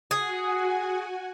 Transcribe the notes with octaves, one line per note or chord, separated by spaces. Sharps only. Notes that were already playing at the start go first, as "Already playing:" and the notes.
F#4 G#4 F#5 G#5